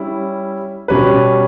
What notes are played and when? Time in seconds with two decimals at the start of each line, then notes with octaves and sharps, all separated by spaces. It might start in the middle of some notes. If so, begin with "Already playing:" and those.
Already playing: G3 C#4 E4
0.88 B2 G3 C#4 G4 B4